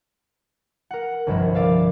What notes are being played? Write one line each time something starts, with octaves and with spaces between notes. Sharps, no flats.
A#4 F#5
G1 C2 G2 F3 A#4 E5
D5 E5 F5